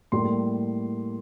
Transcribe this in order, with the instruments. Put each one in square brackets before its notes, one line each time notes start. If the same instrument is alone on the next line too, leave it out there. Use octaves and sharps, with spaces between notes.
[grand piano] A2 G3 A#3 C6